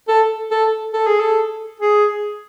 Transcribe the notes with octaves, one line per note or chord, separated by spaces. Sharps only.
A4
A4
A4
G#4
A4
G#4